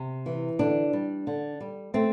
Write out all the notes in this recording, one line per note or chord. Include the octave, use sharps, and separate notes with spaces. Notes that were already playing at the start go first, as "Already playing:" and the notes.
Already playing: C3
E3
D3 D4
G3
D3
G3
A3 C4